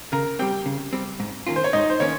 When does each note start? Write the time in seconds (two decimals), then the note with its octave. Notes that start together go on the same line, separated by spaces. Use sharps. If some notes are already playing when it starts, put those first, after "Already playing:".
0.12 C#3 A#4 A#5
0.39 G3 C4 G4 G5
0.66 C#3
0.93 G3 C4
1.20 G#2
1.47 D#3 A#3 C#4 F4
1.56 C5
1.64 C#5
1.73 G#2 D#4 D#5
1.90 C5
2.00 D#3 A#3 C#4 C#5